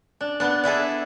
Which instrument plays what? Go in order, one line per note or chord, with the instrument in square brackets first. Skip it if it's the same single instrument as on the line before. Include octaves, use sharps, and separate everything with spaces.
[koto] D4
B3 D4
D4 E4 G#4 A4